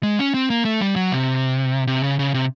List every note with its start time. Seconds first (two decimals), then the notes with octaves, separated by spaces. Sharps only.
0.03 G#3
0.19 C#4
0.34 C4
0.50 A#3
0.65 A3
0.81 G3
0.96 F#3
1.12 C3
1.87 C3
2.03 C#3
2.19 C#3
2.34 C3